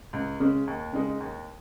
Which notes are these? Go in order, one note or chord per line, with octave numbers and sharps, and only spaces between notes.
C#2
C#3 G#3 C#4
D#2
C#3 G#3 D#4
D#2